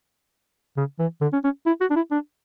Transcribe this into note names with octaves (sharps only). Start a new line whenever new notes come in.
C#3
E3
D3
C#4
C#4
E4
F#4
D4
E4
D4